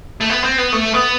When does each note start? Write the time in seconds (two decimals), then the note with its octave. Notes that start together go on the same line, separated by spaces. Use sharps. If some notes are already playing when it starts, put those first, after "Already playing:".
0.21 A3
0.30 B3
0.44 C4
0.58 B3
0.73 A3
0.94 B3